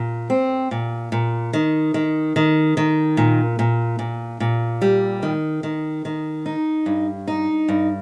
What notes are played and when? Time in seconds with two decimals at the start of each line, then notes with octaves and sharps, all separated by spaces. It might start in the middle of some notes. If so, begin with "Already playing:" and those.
Already playing: A#2
0.30 C4
0.71 A#2
1.12 A#2
1.53 D#3
1.94 D#3
2.36 D#3
2.77 D#3
3.17 A#2
3.59 A#2
3.99 A#2
4.40 A#2
4.82 G3
5.23 D#3
5.63 D#3
6.05 D#3
6.46 D#4
6.86 G2
7.28 D#4
7.68 G2